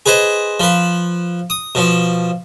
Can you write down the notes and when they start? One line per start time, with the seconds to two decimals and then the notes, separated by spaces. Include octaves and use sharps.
0.06 G#4 B4 C5 D#5
0.60 F3 B4
1.50 D#6
1.75 B2 F3